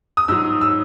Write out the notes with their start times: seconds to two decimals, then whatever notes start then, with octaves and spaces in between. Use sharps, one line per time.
0.17 D#6
0.28 G#2 F#3 E6
0.61 E6